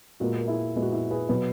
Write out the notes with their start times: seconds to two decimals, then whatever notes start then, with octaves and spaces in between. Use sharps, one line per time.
0.20 A#2 G#3 B3 F#4 A#4
0.35 A#4
0.47 E4 G#4
0.75 A#2 G#3 B3
0.82 F#4
0.93 E4
1.10 G#4 B4
1.29 B2 F#3 B3